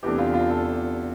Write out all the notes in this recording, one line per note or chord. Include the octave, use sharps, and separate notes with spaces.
E2 C3 E3 A3 D4 G4
F4
F4
A4